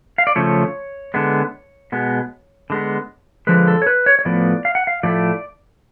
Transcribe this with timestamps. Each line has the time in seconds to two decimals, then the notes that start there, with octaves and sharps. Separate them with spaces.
0.18 F5
0.27 D5
0.36 C#3 F3 A3 C#5
1.14 D3 G#3 B3
1.92 B2 G#3 B3
2.70 D3 G#3 B3
3.47 D3 F3 G#3 B4
3.68 A4
3.82 C#5
3.87 B4
4.06 C#5
4.19 C#5
4.25 A2 F3 B3 D5
4.65 F5
4.75 F#5
4.87 F5
5.03 A2 F3 A3 D5